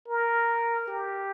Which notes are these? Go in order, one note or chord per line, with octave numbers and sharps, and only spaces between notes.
A#4
G4